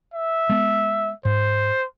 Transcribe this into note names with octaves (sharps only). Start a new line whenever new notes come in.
E5
G#3 B3
G#2 C5